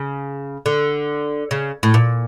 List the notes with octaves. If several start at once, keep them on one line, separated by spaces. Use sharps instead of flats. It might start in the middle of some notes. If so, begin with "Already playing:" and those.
Already playing: C#3
D3
C#3
A2
A#2